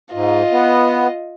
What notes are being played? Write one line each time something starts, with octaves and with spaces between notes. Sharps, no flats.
G#2 F4 D#5
B3